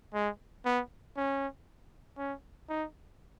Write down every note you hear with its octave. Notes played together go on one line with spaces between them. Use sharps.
G#3
B3
C#4
C#4
D#4